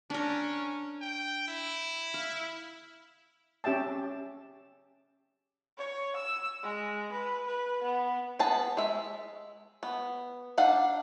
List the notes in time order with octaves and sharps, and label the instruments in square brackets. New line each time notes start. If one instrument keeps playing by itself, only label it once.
[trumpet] C#4 [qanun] D4 A#4
[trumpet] G5
E4
[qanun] F5
[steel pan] C#4 G4 E5 G5 A5
[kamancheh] C#5
E6
G#3
B4
B4
B3
[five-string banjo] B3 G#4 A5
G#3 E5
B3
D4 D#4 F5 F#5